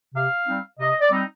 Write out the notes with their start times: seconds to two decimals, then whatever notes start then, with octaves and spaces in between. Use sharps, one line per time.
0.15 C3 F5
0.47 G3 C4 D#4
0.79 C3 D#5
1.01 D5
1.11 G3 C4 D#4